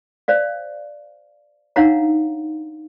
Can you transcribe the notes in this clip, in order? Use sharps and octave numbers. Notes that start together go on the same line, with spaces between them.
C5 D5 F5
D4 D#4 C#5 F5 F#5 A#5